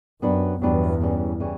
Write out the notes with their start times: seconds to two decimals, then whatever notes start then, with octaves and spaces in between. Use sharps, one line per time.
0.22 F#2 F#3 B3 D4 G4 B4
0.62 E2 G2 F#3 B3 D4 G4 B4
1.01 C#3 E3 G3 C#4
1.40 C#3 E3 G3 C#4